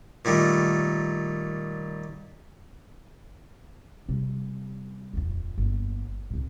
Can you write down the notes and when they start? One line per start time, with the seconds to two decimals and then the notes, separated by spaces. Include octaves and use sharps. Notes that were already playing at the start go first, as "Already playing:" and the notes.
0.25 A#2 D#3 G3 A3
4.08 C3 G3
5.13 D#1 F2
5.58 G1 A#3
6.30 C2 A#2